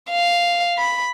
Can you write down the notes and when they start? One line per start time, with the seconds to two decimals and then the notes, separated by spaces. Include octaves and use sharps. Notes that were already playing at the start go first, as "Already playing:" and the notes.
0.10 F5
0.78 B5